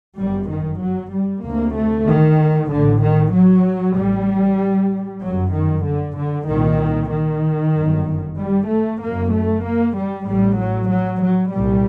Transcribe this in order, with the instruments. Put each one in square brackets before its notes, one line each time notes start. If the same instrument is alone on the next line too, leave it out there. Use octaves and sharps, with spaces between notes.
[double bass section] G1 F#2 G3
D#3
F#3
G3
D2 C3 A#3
A3
D#3
A1 A2 D3
D#3
F#3
A1 A2 G3
G1 F#2 F#3
D#3
D3
D3
C2 A#2 D#3
D#3
G1 F#2
G3
A3
F#1 F#2 A#3
A3
A#3
G3
A1 A2 G3
F#3
F#3
F#3
C2 A#2 G3